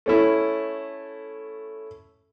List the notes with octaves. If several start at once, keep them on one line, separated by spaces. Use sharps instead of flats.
A3 C#4 E4